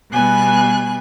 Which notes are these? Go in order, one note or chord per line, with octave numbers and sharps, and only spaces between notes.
B2 G3 B3 G#5 F#6